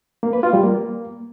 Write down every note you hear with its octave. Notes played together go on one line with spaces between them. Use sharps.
A#3
B4
F4
G3
A#3